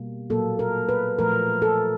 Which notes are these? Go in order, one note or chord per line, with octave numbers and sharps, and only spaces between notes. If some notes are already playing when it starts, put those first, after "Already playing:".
Already playing: B2 G3 A#3
A#2 F#3 A#3 A4
A#4
B4
A#2 F3 A3 A#4
A4